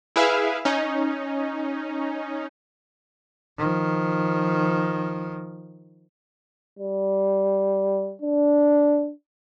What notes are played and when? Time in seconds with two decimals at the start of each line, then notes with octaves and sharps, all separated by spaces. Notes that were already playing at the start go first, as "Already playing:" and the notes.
0.16 E4 G#4 B4 E5 F5
0.65 C#4 D#4
3.58 D#3 F3
6.79 G3
8.22 D4